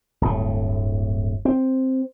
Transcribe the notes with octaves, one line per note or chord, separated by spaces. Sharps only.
D1 G1 A2
C4